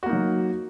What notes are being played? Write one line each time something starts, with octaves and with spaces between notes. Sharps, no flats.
F#3 A#3 D#4 F#4